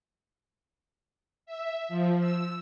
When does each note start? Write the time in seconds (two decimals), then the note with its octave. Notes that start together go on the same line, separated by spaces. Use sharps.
1.46 E5
1.89 F3
2.20 E6